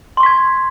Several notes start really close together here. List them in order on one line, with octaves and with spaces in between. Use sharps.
C6 C#6 B6 G#6